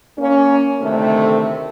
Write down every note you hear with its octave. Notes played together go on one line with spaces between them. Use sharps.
A#3 C#4
D2 C3 D#3 A3